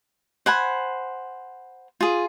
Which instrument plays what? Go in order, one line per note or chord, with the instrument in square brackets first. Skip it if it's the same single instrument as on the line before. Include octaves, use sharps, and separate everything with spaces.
[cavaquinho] C5 F#5 G#5 B5
F4 G#4